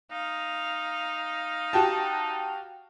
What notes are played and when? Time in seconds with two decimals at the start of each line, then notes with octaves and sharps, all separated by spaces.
0.11 D#4 F5
1.73 F#4 G4 A5